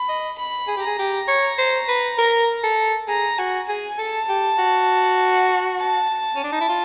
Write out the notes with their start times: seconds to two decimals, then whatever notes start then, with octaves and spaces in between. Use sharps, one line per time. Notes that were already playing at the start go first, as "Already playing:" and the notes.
Already playing: B5
0.09 D#5
0.38 B5
0.68 G#4
0.77 G4
0.83 G#4 A#5
0.99 G4
1.28 C#5
1.58 C5
1.88 B4
2.18 A#4
2.64 A4
3.08 G#4 A#5
3.39 F#4 G#5
3.68 G#4 G#5
3.98 A4 A5
4.29 G4
4.58 F#4
5.79 A5
6.36 C#4
6.44 D4
6.52 D#4
6.61 E4
6.69 F4